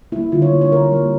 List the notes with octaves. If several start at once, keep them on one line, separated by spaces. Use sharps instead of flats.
G3 A#3 E4
D3 F4
C#5
G3 A#3
C#5
D3 A#4
G3 A#3